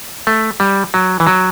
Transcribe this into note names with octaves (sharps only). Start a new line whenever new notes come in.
A3
G3
F#3
E3
F#3